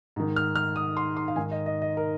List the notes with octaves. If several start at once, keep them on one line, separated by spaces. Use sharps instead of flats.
G#2 D#3
F6
F6
D#6
C6
C6
F5
G#2 D#3 G#5
D#5
D#5
D#5
A#4